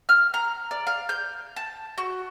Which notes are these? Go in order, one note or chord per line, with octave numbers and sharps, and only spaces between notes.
F6
A#5
D5
F5
G6
A5
F#4